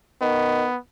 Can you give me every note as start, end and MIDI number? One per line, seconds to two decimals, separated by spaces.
0.21 0.66 51
0.21 0.77 59